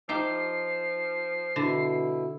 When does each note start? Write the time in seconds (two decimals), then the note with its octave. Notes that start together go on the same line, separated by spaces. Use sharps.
0.09 F3 D#4 G4 E5 C7
1.56 B2 D3 E4